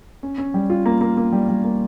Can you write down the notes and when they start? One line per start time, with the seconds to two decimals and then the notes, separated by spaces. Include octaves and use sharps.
0.23 C#4
0.38 C#4
0.54 G3
0.70 F4
0.86 A#3
1.01 A#3
1.17 A#3
1.33 G3
1.49 G3
1.64 A#3